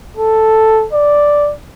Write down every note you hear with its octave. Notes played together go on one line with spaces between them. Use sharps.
A4
D5